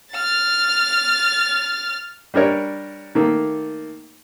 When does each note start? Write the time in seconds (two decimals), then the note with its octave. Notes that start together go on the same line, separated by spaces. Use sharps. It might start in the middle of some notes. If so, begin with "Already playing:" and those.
0.12 F6 A6
2.34 G3 D4 A#4 C#5
3.15 D#3 A3 A#3